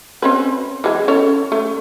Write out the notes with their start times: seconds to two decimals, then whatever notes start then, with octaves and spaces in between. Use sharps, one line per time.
0.22 C4 C#4 B4
0.84 E3 G#3
1.08 C#4 A4 C#5
1.52 A3